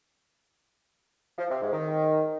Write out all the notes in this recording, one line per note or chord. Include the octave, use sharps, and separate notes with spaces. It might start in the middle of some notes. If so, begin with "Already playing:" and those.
F3
C3
G#2
D#3